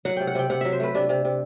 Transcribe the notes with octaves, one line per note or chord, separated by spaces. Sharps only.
F#3 F#5
C3 G5
F#5
C3 G5
C3 F#5
F#3 E5
C5
A3 B4
C3 D4
C3
C3